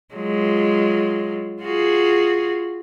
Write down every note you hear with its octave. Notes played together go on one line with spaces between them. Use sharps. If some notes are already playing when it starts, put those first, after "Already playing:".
F#3 G#3 F4
F4 F#4 G#4